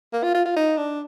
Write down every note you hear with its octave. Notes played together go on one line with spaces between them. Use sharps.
A#3
F4
F4
F4
D#4
D4